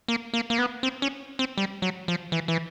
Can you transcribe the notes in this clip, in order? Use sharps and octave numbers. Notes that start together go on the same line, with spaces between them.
A#3
A#3
A#3
B3
C4
C#4
C4
G3
F#3
F3
E3
E3